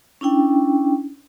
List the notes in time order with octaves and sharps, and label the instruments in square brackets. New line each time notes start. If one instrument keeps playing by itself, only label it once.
[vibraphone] C#4 D4 E4 G5